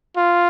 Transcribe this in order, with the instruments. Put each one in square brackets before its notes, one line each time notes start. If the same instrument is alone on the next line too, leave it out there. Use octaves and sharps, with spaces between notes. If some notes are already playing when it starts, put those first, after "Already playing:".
[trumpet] F4